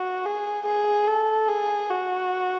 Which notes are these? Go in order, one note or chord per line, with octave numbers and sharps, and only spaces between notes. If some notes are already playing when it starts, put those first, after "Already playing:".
Already playing: F#4
G#4
G#4
A4
G#4
F#4